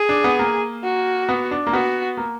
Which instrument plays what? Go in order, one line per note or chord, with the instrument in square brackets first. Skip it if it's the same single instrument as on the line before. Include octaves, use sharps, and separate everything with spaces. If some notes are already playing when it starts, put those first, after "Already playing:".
Already playing: [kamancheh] G#4
[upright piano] D4
B3
A#3
[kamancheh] F#4
[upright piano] B3
D4
A#3
[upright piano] B3 [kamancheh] F#4
[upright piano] A#3